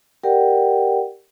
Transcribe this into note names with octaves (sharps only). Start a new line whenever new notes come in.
G4 A#4 D5 F#5 G5